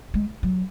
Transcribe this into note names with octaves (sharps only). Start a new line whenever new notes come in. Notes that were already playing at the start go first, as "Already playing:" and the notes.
G#3
F#3